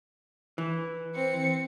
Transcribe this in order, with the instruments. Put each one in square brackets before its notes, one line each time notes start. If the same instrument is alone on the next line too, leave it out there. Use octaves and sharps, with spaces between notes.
[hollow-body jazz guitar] E3
[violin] C4 C#7